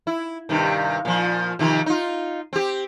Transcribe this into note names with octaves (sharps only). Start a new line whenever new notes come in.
E4
G2 C3 D#3
A#2 F3
C3 D#3 F3
D#4 F4
C4 G4